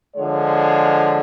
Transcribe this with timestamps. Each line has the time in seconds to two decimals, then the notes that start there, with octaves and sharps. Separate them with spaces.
0.16 D3 F3 G#3 C#5